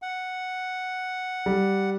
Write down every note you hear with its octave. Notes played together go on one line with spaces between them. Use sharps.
F#5
G3